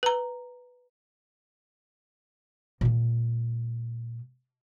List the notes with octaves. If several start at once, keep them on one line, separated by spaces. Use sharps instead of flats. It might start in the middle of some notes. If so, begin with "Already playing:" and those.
B4 A#5
A#2 G#3